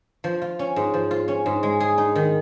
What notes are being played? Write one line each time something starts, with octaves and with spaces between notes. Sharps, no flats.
F3
F4
C#4
G#2
F3
F4
C#4
G#2
G#3
G#4
D#4
D#3